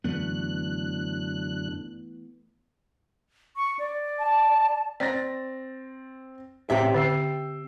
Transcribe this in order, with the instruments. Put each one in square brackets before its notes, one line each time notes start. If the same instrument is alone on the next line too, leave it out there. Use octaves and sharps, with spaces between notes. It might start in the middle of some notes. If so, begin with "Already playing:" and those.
[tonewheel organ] F#2 D3 F#6 [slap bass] E3 A3 B3
[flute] C#6
D5
[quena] A5
[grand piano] C4 A6 A#6 [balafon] D5
[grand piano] A1 [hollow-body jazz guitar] C4 G4 E5
[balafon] D3 [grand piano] G5 E6 C7